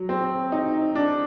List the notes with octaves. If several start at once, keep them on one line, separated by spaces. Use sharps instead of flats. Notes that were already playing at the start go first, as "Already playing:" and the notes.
Already playing: F#3
C4
D#4
D4